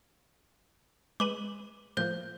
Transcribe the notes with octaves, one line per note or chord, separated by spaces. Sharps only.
G#3 B4 D6 D#7 F#7
A2 F3 A#3 C5 G6